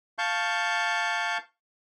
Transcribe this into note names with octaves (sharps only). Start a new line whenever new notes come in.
F5 A5 C#6 G6